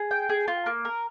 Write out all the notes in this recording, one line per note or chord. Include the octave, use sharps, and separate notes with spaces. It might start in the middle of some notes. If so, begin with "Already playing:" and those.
Already playing: G#4
G5
G#4
F4
A#3
A#4